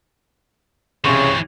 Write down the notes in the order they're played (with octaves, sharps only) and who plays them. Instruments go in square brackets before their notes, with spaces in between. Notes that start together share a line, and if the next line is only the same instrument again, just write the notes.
[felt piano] C2 C#5 C6 [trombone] C#3 [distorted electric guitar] E3 C4 [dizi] C#6